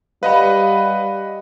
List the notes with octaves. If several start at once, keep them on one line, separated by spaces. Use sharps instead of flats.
G3 B4 D#5 F5 F#5 B5